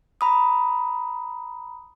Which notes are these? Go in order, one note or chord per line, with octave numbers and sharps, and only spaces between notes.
A#5 B5 D#6